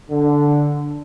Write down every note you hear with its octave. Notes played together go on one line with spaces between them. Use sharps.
D3